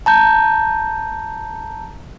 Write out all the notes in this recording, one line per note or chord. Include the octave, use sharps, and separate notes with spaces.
A5 A#5 G6